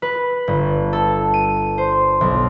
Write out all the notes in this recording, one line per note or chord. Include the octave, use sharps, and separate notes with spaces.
B4
G1
A4
D#7
C5
B1